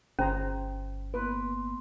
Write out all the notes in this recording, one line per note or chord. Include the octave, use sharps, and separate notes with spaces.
G1 C#4 G#4 C5 A#5
A#3 B3 B4 C6